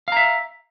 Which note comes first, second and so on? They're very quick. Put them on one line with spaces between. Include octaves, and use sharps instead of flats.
F5 A#5 E5